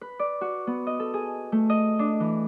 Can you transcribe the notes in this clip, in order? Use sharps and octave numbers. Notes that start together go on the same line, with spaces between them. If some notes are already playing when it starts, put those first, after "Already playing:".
B4
D5
F#4
B3
D#5
A4
G#4
A3
D#5
D4
E3